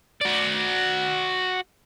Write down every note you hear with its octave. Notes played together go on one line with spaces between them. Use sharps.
F#4 D5